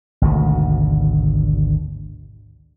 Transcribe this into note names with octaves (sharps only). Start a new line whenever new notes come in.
G#1 D2 B2